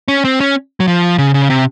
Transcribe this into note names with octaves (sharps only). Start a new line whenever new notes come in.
C#4
C4
C#4
F#3
F3
C#3
C#3
C3